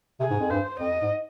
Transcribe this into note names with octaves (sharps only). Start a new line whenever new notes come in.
C3 G#4
G#2
F2
G2 C5
F2 D#5
G#2